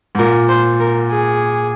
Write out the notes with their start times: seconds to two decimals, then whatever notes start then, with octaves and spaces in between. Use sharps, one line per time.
0.15 G#2
0.19 A#2 A#4
0.49 C5
0.80 A#4
1.11 G#4